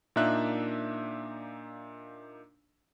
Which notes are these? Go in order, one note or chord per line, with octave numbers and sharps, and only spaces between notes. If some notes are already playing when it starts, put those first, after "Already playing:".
A#2 A#3 D4 D#4 E5 F#6